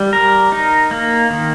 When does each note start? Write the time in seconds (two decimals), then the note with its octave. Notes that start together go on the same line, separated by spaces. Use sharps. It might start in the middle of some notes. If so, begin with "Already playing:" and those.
Already playing: G3
0.13 A#4
0.52 D#4
0.91 A#3
1.30 D#3